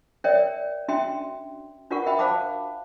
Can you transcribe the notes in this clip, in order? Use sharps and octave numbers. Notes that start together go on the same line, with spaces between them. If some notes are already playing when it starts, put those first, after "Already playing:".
A#4 C#5 D5 E5 G5
C#4 D4 F#4 E5 G5 C6
D4 F4 F#4 A#4 F#5 C#6
A#4 E5 G5 B5
C5 F5 A5 B5 D6